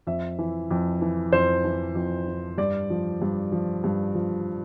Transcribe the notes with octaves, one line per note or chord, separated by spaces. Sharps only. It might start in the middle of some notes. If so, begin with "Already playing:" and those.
F2 E5
E3
F2
E3
F2 C5
E3
F2
E3
G2 D5
F3
G2
F3
G2
F3